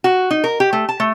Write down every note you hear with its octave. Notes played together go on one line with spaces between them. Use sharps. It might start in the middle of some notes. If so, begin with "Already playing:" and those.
F#4
D#4
A#4
G4
A3
A5
A3